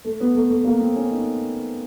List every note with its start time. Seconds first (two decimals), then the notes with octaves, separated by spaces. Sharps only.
0.05 A3
0.20 B3
0.35 A3
0.50 A3
0.64 A#3
0.80 C4
0.96 C#4
1.11 D#4